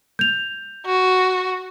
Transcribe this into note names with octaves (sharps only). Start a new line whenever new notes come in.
G6 F7
F#4